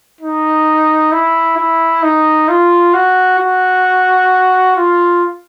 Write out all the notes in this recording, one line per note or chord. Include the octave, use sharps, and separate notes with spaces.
D#4
E4
E4
D#4
F4
F#4
F#4
F4